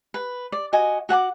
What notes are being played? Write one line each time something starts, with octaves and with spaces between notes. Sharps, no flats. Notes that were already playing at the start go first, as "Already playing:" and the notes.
B4
D5
F#4 D#5 G#5
F#4 F#5 G#5 D6